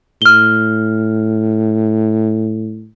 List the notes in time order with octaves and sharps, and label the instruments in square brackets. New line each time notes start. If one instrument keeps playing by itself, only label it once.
[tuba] A2 [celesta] F6 G7